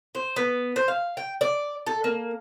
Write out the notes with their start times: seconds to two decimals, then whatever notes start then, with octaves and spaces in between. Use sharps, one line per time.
0.15 C5
0.36 B3
0.76 C5
0.88 F5
1.17 G5
1.41 D5
1.87 A4
2.04 A#3